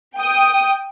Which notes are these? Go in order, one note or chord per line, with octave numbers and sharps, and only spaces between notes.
G5 D#6